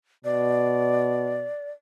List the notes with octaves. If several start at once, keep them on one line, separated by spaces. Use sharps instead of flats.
B2 D5